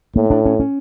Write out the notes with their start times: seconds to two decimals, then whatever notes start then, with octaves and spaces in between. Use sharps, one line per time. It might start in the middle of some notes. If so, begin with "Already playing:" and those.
0.16 A2 A#3
0.30 D4
0.45 C#4
0.60 C#4